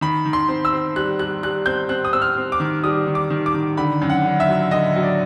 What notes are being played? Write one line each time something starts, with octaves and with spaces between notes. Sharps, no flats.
D#3 B5
D#3
C6
C4
E6
C4
G3 F#6
G3 F#6
G3 F#6
C4 G6
C4 F#6
D#6
C4 E6
F6
C4
D6
D#3
G3 D#6
D#3
D6
D#3
D6
D#3
D3 B5
F#2
F#5
D3
E5
F#3
D3 D#5
F#3
D5